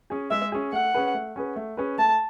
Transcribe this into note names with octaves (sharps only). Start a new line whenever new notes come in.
C#4 G#4
G#3 E5
C#4 G#4
A3 F#5
C#4 G#4 B4
A3
C#4 G#4 B4
A3
C#4 G#4 B4
A3 A5